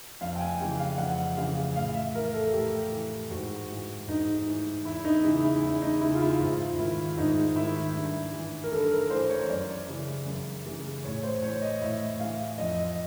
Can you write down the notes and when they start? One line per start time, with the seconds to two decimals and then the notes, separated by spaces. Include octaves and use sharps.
0.21 F2 F5
0.36 G5
0.41 G#5
0.60 C#3 E3
0.79 F5
0.98 F2 F#5
1.37 C#3 E3 F5
1.75 A2 F5
1.95 E5
2.15 E3 A#4
2.34 A4
2.53 A2 G4
2.92 E3
3.30 G#2 F#4
3.69 E3
4.07 G#2 D#4
4.46 E3
4.85 E2 E4
5.05 D#4
5.24 C#3 E3 E4
5.44 E4
5.63 E2 E4
5.82 D#4
6.01 C#3 E3 E4
6.15 F4
6.21 E4
6.40 G#2 F4
6.78 D#3 E4
7.17 G#2 D#4
7.56 D#3 E4
7.95 G2
8.33 E3
8.64 A#4
8.72 G2 A4
8.91 A#4
9.10 E3 C5
9.30 C#5
9.50 F#2 D5
9.87 C#3 E3
10.26 F#2
10.66 C#3 E3
11.04 A2 C#5
11.23 C5
11.43 E3 C#5
11.62 D#5
11.81 A2 E5
12.20 E3 F5
12.58 F2 D#5